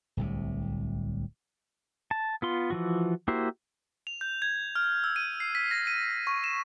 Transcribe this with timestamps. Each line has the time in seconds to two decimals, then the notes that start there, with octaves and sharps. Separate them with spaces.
0.17 D1 C2 C3
2.11 A5
2.42 B3 F4 C6
2.70 E3 F3 F#4
3.28 A#3 E4 F#4 G4 C5
4.07 F7
4.21 G6
4.42 G#6
4.76 F6
5.04 E6
5.16 D#7
5.40 C7
5.55 B6
5.71 A#6
5.87 D#7
6.27 C#6
6.44 E7